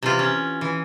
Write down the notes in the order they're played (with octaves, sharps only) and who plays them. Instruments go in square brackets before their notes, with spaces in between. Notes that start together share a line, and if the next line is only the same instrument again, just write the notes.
[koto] C3 E3 F4
C#4
E3